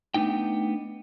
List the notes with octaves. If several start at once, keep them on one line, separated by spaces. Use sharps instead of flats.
A3 B3 D4 D#4 G5